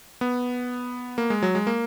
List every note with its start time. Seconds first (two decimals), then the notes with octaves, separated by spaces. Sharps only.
0.21 B3
1.18 A#3
1.30 G#3
1.42 F#3
1.55 G#3
1.67 A#3